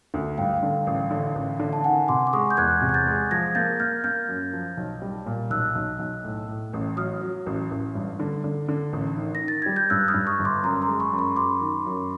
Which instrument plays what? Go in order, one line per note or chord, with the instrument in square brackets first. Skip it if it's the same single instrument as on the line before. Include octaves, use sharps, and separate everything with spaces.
[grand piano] D2
[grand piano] G2 [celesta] F5 G5
[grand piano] D3
A1
D3
A1
D3
[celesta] A5
[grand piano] D#3 [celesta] F#5 G#5
[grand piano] C3 [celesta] C6 D6
[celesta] D6
[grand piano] G#3 [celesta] C#6 D#6
[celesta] G6
[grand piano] E2 [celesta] F#6 G#6
[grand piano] C3
[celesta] G#6
G6 A6
[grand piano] G#3
[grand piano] F3 [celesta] G#6 A#6
[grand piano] A#3 [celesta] G6 A6
[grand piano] A#3 [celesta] F6 G6
[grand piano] A#3 [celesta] F6 G6
[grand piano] F#2
F3
B1
G3
A#2
[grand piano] B1 [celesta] E6 F#6
[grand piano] B1
B1
A2
A2
A1
[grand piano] F#3 [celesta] D#6 F6
[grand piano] F#3
A1
A1
G2
D3
D3
D3
A1
D#3
[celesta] A#6
[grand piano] D#3
[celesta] A6
[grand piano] G3 [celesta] G#6
[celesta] G6
[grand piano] G2 [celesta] E6 F#6
[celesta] D#6 F6
[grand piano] G2
[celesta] C#6 D#6
[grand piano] G1
[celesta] C6 D6
[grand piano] F#2 [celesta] A#5 C6
[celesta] A#5 C6
[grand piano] G#3
[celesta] B5 C#6
[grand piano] F#2
[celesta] B5 C#6
[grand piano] F#2 [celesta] C6 D6
[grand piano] D#3
F#2